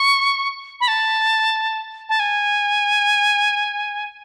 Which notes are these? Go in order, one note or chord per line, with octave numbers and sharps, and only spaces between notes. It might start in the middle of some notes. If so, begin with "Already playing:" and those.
Already playing: C#6
B5
A5
A5
G#5